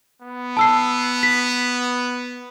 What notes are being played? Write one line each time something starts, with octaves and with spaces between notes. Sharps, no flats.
B3
A5 E6 C7
B6